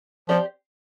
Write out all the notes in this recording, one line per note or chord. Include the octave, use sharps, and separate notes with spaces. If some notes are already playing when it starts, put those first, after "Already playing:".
F3 C4 G4 D5